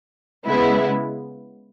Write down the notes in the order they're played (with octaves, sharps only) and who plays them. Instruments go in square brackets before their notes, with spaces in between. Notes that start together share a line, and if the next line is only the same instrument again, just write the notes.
[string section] C#3 G#3 B3 E4